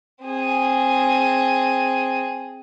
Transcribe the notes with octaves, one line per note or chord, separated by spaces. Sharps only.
C4 G#4